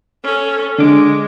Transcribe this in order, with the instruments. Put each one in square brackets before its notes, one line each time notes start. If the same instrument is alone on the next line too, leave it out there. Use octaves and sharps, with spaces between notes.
[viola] C#4 A4
[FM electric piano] D3 D6 [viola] G#3